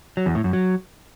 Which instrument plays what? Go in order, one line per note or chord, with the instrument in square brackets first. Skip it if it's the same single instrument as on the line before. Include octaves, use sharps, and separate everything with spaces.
[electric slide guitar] F#3
E2
A2
F#2
F#3